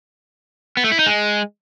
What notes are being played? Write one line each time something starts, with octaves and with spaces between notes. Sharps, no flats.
B3
A3
E4
D#4
G#3